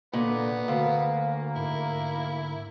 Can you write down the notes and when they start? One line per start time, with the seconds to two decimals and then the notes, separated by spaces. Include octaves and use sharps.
0.13 A#2 D3 B3
0.68 D2 A#3 F5
1.56 G#2 E4